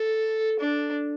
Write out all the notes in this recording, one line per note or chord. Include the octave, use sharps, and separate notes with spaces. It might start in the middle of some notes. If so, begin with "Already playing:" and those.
Already playing: A4
D4